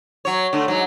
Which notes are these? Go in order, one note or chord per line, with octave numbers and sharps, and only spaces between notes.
F#3 C#5
D3 A3
G#2 F#3